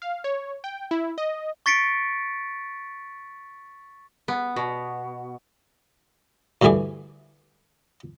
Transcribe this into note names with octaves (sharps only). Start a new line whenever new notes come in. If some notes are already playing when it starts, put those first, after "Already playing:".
F5
C#5
G5
E4
D#5
C#6 A6 B6 C#7 D7
B3
B2
D2 G2 D3 E3 G#4 D6